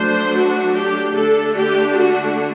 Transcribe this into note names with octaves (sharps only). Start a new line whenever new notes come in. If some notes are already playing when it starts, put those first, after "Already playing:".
Already playing: F#3 A3 D4 C5
F#4
G4
D3 A3 D4 A4
G4
F#4